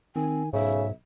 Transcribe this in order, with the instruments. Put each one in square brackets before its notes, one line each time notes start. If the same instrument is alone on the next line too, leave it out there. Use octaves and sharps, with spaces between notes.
[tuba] D#3 [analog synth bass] C4 [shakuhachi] G#5
[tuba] B1 [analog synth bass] G#2 [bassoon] C#3 [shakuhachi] E5